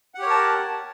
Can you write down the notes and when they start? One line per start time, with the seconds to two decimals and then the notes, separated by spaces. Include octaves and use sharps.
0.15 F#5
0.19 G4
0.22 C#5
0.26 A#4
0.30 A5